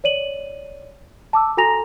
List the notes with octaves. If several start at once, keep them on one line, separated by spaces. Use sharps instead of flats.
C#5 D5 D#7 F#7
A5 D6 E6
F#4 A4 G#5 A#5 A#6 F7